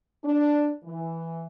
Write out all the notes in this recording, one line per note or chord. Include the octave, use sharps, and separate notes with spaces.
D4
E3